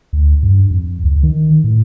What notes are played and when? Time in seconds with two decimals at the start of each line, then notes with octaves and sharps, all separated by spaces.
0.13 D2
0.43 G2
0.71 F2
1.04 C#2
1.23 D#3
1.64 A2